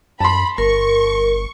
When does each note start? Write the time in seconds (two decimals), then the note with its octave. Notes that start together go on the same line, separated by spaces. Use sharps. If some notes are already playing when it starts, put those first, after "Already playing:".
0.20 F#2 A5 B5 C6
0.58 G1 A#4 C#6